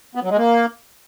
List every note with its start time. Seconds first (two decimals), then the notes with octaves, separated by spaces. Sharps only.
0.15 B3
0.23 F#3
0.30 G#3
0.37 A#3